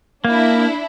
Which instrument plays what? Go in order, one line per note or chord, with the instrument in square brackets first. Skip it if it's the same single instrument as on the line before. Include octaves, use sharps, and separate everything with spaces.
[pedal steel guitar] A#3 [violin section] D4 E4